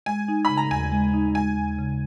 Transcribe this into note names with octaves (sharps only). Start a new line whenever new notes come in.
G#3 G#5
D#4
C#3 B5
A#5
D#2 G#5
G#3
D#4
G#3 G#5
D#2
C#3